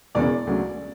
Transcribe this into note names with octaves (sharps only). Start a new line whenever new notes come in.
E1 E2 C#3 D5
D2 C#3 F#3